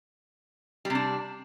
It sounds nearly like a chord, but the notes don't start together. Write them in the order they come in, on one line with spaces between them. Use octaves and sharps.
G3 C3 D4